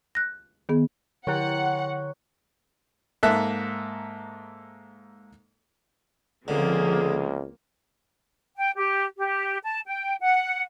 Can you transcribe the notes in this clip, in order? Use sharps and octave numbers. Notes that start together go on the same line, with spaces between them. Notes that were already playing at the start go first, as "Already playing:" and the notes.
F#6 A#6
D#3 B3 G#4
D3 E4 C#5 F#5 G5 A#5 F#6
G#2 A#3 A4 E5 F#6
C#2 D3 F3 A#3 C4 G#4
G5
G4
G4
A5
G5
F#5